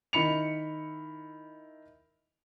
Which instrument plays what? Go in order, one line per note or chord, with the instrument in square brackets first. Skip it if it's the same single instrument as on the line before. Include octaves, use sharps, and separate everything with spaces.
[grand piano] D#3 E4 B5 C#7 F7